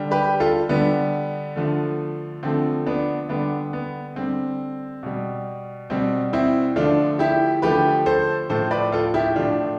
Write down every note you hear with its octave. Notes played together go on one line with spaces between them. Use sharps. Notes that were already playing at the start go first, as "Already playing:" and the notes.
Already playing: D3 G3
G4 B4
F4 A4
D3 G3 B3
D3 F3 A3
D3 F3 A3 C4
B3 D4
D3 G3 B3 D4
B3
D3 G3 C4
B2 G3
B2 G3 C4
C4 E4
D3 F3 A3 D4 F4
E4 G4
D3 F3 A3 G4 B4
A4 C5
A2 F3 A3 A4 C5
B4 D5
F4 A4
E4 G4
A2 F3 A3 D4 F4